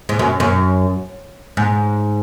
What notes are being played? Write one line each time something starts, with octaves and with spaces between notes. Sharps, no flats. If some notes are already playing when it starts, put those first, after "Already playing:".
G#2
F#2
F#2
G#2